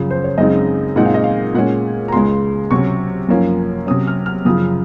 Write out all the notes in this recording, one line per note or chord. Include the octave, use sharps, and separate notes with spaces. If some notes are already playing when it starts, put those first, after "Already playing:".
Already playing: F#2 C#3 F3
C5
C#5
F#2 C#3 G#3 C4 D#4 D#5
A#2 G#3 C4 D#4 F#5
F5
D#5
F5
A#2 G#3 C#4 F#5
A#5
C#2 C#3 G#3 C6
C3 F#3 C#4 C#6
F#2 F3 A#3 C#4
C3 F#3 C#4 D#6
F6
F6
F#2 C#3 F3 D#6